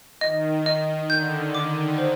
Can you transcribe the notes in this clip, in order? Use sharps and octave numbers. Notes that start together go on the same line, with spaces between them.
D#3 D#5
D#5
D3 G6
D#3 D6
C5